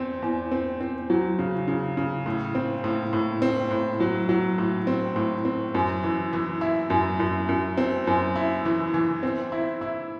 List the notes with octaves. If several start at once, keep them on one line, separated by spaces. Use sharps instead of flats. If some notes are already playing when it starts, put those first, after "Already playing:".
Already playing: E2 C4
E2
C4
C4
F#3
C#3
C#3
C#3
A2
C4
A2
A2
C4
A2
F#3
F#3
A2
C4
A2
C4
F#2
E3
E3
E4
F#2
F#2
F#2
C4
F#2
E4
E3
E3
C4
E4
E4